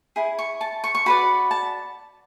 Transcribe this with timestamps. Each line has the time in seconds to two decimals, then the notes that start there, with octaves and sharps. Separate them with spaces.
0.16 E4 G#4
0.39 C#6
0.61 A5
0.84 C#6
0.95 C#6
1.06 F#4 B4 D5 B5
1.51 A5